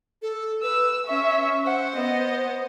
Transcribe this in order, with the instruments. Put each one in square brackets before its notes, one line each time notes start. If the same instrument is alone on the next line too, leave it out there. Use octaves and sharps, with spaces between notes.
[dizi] A4
[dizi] B4 [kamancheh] E6
[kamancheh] C#4 E5 [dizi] C#6
[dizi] C5 [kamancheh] F#5
[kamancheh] B3 D#5